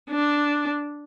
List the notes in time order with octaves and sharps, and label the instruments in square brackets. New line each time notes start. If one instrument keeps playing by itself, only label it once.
[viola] D4